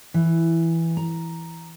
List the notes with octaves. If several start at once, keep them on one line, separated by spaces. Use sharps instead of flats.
E3
A#5